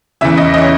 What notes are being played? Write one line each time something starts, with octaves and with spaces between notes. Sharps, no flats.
E2 C#3 E3 E5
D#5
C#3 E3 D#5
C#5